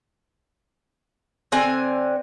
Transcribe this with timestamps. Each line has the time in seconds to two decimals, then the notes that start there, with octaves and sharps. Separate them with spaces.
1.52 D3 C4 G#5